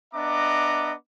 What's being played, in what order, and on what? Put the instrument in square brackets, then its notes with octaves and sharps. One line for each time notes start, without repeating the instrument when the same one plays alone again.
[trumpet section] B3 D4 D#5 E5 A#5 D6